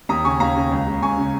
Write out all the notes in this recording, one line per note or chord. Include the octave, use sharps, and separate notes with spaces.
D#2 A#5 D#6
C#3 G#5 C#6
D#2 F5 A#5
C#3
C#2
C#3
C#2 G#5 C#6
C#3